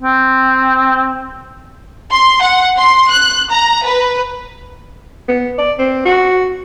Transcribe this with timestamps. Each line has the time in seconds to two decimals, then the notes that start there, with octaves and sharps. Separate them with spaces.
0.02 C4
2.12 C6
2.42 F#5
2.78 C6
3.11 F#6
3.51 A#5
3.86 B4
5.28 B3
5.58 D5
5.79 C4
6.06 F#4